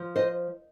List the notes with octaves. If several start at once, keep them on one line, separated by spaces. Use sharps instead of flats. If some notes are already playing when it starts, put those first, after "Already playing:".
Already playing: F3
C5 D#5